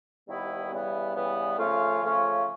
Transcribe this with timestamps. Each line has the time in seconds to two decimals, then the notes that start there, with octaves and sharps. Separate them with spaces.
0.27 D#2 D#3 G3 B3 E4
0.71 C#3 E3 G3 B3
1.14 C#3 E3 G3 B3
1.58 C#3 F3 A3 C#4 F4
2.01 C#3 F3 A3 C#4 F4